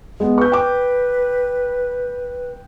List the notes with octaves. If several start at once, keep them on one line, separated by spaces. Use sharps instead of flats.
G#3 B3
B4 C#6 G6
G5 D6